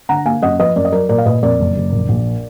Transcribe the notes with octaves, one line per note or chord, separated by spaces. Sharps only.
D3 F#5 A#5
A#3 F5 G#5
F#2 D#5 F#5
F3 B4 D#5
F#2 A#4 D5
D#5
F#3 A#4 D5
A#2 A#4 D5
F5
A#2 B4 D#5
F2 A#4 D5
F#1
F#1
A#1
A#1